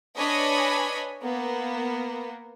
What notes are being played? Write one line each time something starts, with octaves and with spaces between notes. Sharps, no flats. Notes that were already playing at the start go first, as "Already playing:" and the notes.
D4 B4 C#5 D#5 G#5 B5
A#3 B3